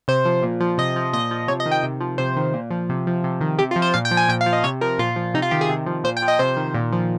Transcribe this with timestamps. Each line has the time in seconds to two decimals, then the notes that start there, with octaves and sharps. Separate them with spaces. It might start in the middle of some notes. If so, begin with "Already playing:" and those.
0.08 C3 C5
0.25 F3
0.43 A#2
0.60 F3
0.78 C3 D#5
0.96 F3
1.13 A#2 D#5
1.31 F3
1.48 C3 C#5
1.60 D#5
1.66 D#3
1.71 G5
1.83 C3
2.01 F3
2.18 C3 C5
2.37 D#3
2.54 A#2
2.71 F3
2.89 C3
3.07 F3
3.24 C3
3.41 D#3
3.58 C3 G4
3.71 F4
3.76 F3
3.82 C5
3.94 A#2 F5
4.05 G5
4.11 F3
4.17 G#5
4.29 A#2 G5
4.41 F5
4.46 F3
4.53 D#5
4.64 C3 C#5
4.81 F3 A#4
4.99 A#2 F4
5.16 F3
5.34 C3 D#4
5.42 F4
5.51 D#3 G4
5.61 G#4
5.69 C3
5.86 F3
6.04 A#2 C5
6.17 G5
6.22 F3
6.28 D#5
6.39 C3 C5
6.57 D#3
6.74 A#2
6.92 F3